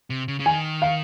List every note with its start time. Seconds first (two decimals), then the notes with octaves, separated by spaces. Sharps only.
0.10 C3
0.28 C#3
0.39 C#3
0.46 D#3 G#5
0.82 F5